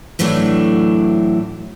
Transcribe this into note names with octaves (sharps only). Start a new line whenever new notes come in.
A2 E3 F#3 A3 D4